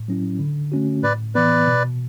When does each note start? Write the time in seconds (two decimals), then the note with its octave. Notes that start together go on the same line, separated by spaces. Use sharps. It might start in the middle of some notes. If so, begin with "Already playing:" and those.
Already playing: A2
0.08 F#3 C#4 E4
0.39 D3
0.72 A3 C#4 F#4
1.03 A2 B4 D5
1.35 E3 B3 B4 D5
1.68 B2